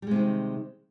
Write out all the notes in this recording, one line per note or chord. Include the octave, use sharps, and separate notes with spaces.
C3 D#3 G3 G#3